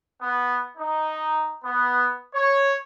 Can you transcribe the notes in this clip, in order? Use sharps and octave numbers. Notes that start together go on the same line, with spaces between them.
B3
D#4
B3
C#5